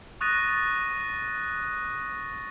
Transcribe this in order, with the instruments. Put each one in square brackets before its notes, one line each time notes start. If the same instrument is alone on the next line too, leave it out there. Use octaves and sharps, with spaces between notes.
[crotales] C#6 D#6 F#6 A6 A#6 D#7